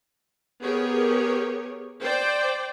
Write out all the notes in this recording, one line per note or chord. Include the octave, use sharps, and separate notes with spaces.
B3 G4 G#4 A#4 C#5
C5 D5 G5